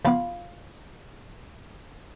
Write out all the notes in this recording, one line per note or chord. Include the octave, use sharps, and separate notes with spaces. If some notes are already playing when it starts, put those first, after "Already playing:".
C#3 F3 B3 F4 F5 B5